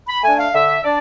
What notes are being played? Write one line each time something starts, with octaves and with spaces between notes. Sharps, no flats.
B5
A3 D4 G#5
F5
D3 E5
D4 D5